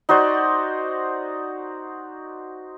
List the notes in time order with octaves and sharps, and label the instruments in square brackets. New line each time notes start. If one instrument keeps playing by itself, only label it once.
[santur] D#4 F#4 C5 D5